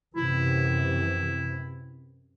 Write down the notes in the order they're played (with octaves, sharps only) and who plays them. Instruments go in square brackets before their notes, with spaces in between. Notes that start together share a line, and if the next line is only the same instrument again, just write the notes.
[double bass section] F#2 C3 E3 [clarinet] E4